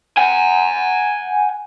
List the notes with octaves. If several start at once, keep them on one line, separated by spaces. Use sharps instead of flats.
F#5 G#5